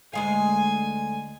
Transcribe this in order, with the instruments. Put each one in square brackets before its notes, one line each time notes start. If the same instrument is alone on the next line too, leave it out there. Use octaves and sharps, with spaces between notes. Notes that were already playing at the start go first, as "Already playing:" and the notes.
[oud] D2 G#3 F5 [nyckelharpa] G#5